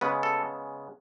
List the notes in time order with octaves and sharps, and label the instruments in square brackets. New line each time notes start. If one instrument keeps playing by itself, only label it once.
[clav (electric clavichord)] C#3 G#3 B3 B4
A4